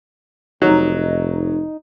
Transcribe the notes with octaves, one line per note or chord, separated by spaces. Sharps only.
F1 F#3 D#4